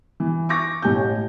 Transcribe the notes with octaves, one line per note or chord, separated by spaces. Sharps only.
E3
C#6 D6 A#6
A1 A2 G4 G#5 A5 G6